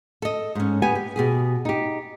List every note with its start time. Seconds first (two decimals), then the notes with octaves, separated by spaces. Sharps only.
0.22 A4 D#5
0.55 G#2 C#4
0.82 B3 G4 G#5
0.95 G4
1.16 B2 G4 G#4
1.65 D#4 G4